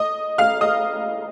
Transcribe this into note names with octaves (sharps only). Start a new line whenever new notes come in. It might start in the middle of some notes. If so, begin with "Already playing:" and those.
Already playing: D#5 D#6
F5 F6
D#5 D#6